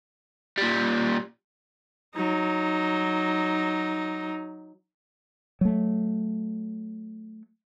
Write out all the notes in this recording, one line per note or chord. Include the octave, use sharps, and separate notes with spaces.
A#2 G3
F#3 D#4
F#3 A3